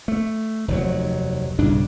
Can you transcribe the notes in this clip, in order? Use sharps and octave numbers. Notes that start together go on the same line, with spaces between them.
A3
F1 D#2 B2 F#3
B1 G2 C#3 D4